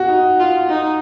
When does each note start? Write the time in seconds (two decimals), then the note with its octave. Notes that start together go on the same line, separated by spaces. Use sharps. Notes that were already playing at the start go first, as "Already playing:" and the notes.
Already playing: F#4
0.08 D#4
0.39 F4
0.69 D#4